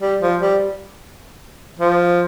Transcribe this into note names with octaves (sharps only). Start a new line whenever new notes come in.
G3
F3
G3
F3